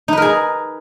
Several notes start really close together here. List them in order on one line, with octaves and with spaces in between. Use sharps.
D#4 B4 A#4 G#4